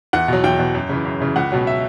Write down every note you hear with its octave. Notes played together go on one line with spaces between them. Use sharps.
E2 F#5
B2 F#3
E2 G5
B2 F#3
F#2
C#3 E3
F#2
C#3 E3
C#2 F#5
B2 F#3
E5